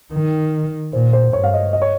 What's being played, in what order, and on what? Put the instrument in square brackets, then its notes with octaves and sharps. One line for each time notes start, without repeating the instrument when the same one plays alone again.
[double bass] D#3
[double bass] A#2 [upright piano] C5
[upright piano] C5
[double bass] G2 [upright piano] C#5
[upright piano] F5
D#5
D#5
C#5